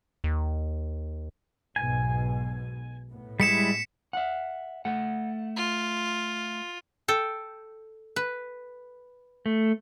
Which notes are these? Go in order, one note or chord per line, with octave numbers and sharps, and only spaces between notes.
D#2
B1 G#2 B2 G#5
A2 B3
G3 G#3 E4 B6 C#7 E7
E5 F#5
A3 F#5
F4
A4 G5
B4
A3